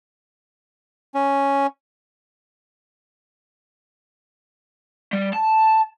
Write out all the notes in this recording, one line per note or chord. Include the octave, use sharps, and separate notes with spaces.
C#4
G3
A5